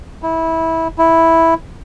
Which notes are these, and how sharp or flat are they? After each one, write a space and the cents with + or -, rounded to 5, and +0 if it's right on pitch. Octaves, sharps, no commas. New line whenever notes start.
E4 -20
E4 -5